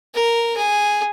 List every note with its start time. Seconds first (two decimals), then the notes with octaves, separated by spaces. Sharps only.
0.15 A#4
0.57 G#4